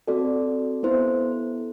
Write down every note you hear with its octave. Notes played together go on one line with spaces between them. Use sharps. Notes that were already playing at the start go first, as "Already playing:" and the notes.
C4 F#4 A4 D5
B3 E4 A4 C5